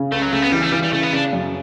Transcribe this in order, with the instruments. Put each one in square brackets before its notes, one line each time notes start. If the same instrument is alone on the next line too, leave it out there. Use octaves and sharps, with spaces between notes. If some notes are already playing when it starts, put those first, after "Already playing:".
Already playing: [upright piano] C#3
[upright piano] C#2 [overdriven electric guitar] A3
[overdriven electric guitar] F#3
[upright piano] C#3 [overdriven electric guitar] A3
[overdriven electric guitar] B3
[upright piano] E3 [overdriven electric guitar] G3
[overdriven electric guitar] A3
[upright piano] E3 [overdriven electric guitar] G3
[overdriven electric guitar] G3
[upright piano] C#3 [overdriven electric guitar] A3
[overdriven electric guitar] B3
[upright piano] C#3 [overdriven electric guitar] D4
[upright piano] F#2